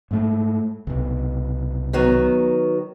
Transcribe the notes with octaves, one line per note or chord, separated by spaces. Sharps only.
G#2 A3
C2 B2
D#3 F#3 B3